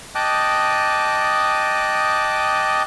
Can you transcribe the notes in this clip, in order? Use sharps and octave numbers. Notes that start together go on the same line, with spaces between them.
D#5 G5 A5 D6 D#6 F#6